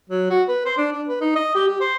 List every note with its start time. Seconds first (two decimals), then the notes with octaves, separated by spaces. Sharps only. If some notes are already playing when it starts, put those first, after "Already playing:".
0.09 F#3
0.30 F#4
0.48 B4
0.65 C5
0.77 D4
0.92 D4
1.08 B4
1.21 D#4
1.35 D#5
1.55 G4
1.68 G4
1.80 C5